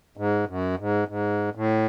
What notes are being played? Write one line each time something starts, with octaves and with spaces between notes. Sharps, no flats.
G#2
F#2
G#2
G#2
A2